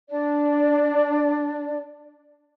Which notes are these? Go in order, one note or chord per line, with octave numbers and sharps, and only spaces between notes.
D4 D5